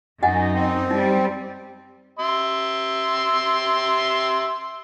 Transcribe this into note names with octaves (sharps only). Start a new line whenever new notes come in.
F#2 D#4 D#5 F#5 G#5
C4
G3 D#4
E5 C6